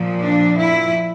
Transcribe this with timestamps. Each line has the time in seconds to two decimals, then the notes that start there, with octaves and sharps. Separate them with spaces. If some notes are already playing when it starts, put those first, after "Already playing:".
Already playing: A#2 F3
0.21 D4
0.57 E4